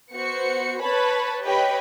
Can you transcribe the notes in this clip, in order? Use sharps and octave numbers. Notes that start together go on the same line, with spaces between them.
B3 F#4 C5 C#7
B4 C#5 A5 B5
G4 B4 C#5 D#5 G5 B5